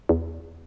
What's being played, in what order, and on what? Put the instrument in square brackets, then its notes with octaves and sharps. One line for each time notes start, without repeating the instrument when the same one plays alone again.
[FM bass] E2